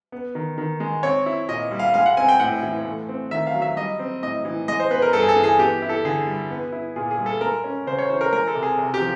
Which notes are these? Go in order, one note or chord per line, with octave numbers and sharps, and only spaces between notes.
B3
D#3
D#3
G#3
C4 C#5
E4
A#2 D#5
G3
F5
G#3 F5
F#5
C4 G#5
G5
A2 F#5
E3
A3
C4
D#3 E5
F5
F#3
E5
G3 D#5
C4
A2 D#5
E3
G#3 D#5
C5
B3 B4
A#4
G2 A4
G#4
A4
E3
G#4
B3 G4
E4
A4
D3 G#4
G3
B3
E4
A#2 G#4
G#4
G3
A4
G#3 A#4
C#4
C#3 C5
C#5
E3 C5
A#4
G#3 A#4
A4
C3
G#4
C3
G4
F3